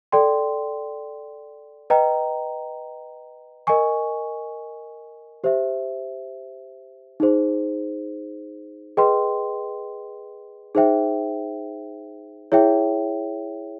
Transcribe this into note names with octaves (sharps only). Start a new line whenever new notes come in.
A4 D5 G5 C6
B4 D#5 G5 A#5
A#4 D#5 G#5 C#6
G4 C5 E5
D#4 G#4 C5
G#4 B4 D#5 G5 C6
D#4 G#4 C5 E5 G5
E4 G#4 C#5 E5 G5